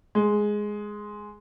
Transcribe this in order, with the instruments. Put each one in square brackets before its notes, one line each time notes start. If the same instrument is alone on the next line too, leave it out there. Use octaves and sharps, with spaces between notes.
[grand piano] G#3